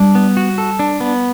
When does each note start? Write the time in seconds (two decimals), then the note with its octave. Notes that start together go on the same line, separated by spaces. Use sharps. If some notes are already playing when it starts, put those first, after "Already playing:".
Already playing: G3 D4
0.15 B3
0.37 F#4
0.58 A4
0.79 D4
1.01 B3